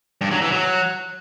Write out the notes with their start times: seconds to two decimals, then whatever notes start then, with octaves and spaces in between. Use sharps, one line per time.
0.21 G2
0.31 F#3
0.41 E3
0.52 F#3